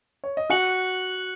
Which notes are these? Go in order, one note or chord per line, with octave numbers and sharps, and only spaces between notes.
C#5
D#5
F#4 F#5 F#6 C#7 F#7